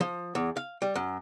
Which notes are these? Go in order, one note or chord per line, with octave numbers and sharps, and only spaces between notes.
F3
E2
F5
G3
F#2